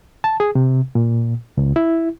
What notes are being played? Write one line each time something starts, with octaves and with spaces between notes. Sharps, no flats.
A5
G#4
C3
A#2
C#2
E4